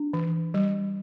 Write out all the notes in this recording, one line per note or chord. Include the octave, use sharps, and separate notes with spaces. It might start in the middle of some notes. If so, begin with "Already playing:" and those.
Already playing: D4
E3
G3